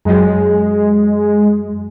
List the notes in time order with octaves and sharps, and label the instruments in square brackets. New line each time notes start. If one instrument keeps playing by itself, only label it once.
[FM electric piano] F#2 F#3 [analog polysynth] G#3